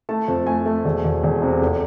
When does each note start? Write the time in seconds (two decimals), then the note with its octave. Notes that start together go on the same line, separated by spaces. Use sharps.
0.09 A3 A5
0.28 F2
0.47 A3 G#5
0.66 A3
0.85 E1
1.04 E1
1.23 E1
1.42 C3
1.61 F1